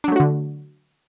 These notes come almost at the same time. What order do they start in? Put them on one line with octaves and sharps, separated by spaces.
D4 F#3 A3 F#4 D3